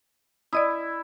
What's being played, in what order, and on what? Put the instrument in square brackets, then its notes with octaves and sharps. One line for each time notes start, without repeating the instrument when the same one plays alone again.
[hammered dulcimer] E4 [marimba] D5 D#5 D#6